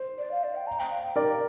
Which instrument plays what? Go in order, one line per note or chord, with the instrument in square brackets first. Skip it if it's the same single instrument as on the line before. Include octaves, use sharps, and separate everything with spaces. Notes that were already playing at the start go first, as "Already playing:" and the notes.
Already playing: [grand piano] C5
[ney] D5
F5
D5
G5
A#5
G5
F5
G5
[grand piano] A#4 D5 [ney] G5